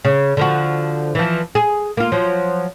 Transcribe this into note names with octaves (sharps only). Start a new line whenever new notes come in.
C#3
D3 F3 F#4
E3 F3
G#4
A#3 F4
F3 F#3